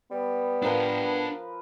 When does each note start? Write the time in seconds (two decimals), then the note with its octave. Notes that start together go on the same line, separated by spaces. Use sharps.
0.11 G3 B3
0.63 F3 D4 A#4 B4 F5